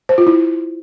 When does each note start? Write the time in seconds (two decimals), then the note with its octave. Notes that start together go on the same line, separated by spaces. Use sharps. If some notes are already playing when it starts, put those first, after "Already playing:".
0.09 C5
0.18 F4
0.27 E4